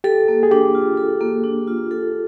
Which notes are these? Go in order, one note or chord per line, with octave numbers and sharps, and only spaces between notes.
G4 A4
A#3
G#4
D4 G4
F4
A4
A#3
D4
F4
A4